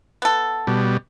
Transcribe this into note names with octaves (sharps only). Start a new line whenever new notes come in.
B3 A4
B2 G3